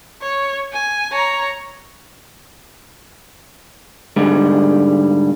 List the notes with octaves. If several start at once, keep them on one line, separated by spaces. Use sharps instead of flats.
C#5
G#5
C#5 A#5
G#2 D3 G3 G#3